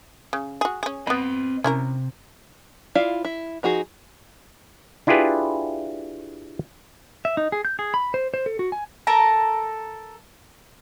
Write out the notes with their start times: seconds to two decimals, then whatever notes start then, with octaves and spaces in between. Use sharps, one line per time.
0.33 C#3
0.61 F#4 G#4
0.83 C#4 G#4
1.07 B3 C4 D#5 B5
1.64 C3 C#4 E4 A#4
2.95 E4 F4 D5 F5
3.25 E4
3.63 F3 D#4 F#4 G#4
5.07 D4 E4 F4 G4 G#4 B4
7.25 E5
7.37 D#4
7.52 G#4
7.65 G6
7.79 G#4
7.94 B5
8.14 C5
8.34 C5
8.46 A4
8.59 F#4
8.72 G#5
9.07 A4 A#4 A5 A#5